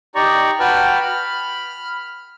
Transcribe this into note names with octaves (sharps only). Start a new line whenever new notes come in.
D#4 G4 D5 A#5 C#6
F#4 B4 G5 A5 B5 F6
B5 F6